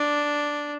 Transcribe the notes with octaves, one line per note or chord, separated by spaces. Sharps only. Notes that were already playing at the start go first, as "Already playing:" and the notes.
Already playing: D4